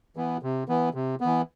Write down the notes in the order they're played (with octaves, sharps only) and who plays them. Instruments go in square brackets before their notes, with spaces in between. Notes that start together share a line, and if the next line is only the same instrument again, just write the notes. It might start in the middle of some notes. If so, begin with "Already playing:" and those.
[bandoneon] E3 B3
C3
E3 B3
C3
E3 B3